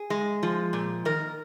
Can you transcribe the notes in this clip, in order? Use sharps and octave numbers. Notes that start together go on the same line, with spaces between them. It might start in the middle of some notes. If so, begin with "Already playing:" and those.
Already playing: G#4
G#3
F3
A#2
D#3 A#4